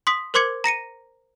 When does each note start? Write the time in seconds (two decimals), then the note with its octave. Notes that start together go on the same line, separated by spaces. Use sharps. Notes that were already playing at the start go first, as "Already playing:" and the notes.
0.07 C6 D#6 B6
0.34 A#4 C5 C6 D6 G#6 C#7
0.64 A#5 A#6 C#7 D#7